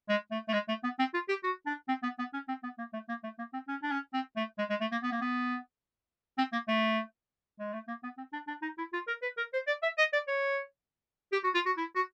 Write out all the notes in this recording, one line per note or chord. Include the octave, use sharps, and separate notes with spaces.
G#3
A3
A3
G#3
A3
B3
C4
F4
G4
F#4
D4
C4
B3
B3
C#4
C4
B3
A#3
A3
A#3
A3
A#3
C4
C#4
D4
C#4
C4
A3
G#3
G#3
A3
A#3
B3
A#3
B3
C4
A#3
A3
G#3
A3
A#3
B3
C4
D4
D4
D#4
E4
F4
A#4
B4
A#4
C5
D5
E5
D#5
D5
C#5
G4
F#4
F4
F#4
E4
F#4